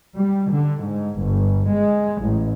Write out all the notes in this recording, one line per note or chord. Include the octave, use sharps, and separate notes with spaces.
G3
D3
G#2
G1
G#3
A1